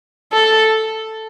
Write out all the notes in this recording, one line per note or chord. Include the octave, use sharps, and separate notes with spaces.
A4